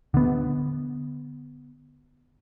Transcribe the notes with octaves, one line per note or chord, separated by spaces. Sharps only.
D3 B3